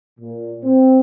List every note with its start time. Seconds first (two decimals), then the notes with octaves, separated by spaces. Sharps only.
0.19 A#2
0.63 C4